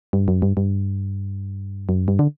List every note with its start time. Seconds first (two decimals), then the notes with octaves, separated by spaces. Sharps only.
0.13 G2
0.28 F#2
0.42 G2
0.57 G2
1.89 F#2
2.08 G2
2.19 D3